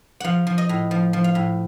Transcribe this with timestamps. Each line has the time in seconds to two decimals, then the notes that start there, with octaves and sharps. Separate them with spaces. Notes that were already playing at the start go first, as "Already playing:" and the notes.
0.20 F3 F5 F#5
0.47 F3
0.58 D#5
0.69 A2
0.91 F3
1.13 F3
1.24 F5
1.35 A2